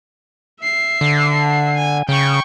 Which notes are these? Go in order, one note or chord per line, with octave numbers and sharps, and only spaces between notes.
E5 C7
D3
G#5
C#3 G5 C#6